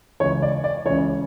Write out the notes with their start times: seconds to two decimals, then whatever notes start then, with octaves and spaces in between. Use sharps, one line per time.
0.20 C#2 C#3 E3 C#5
0.42 D5
0.64 D5
0.85 C#2 C#3 E3 C#5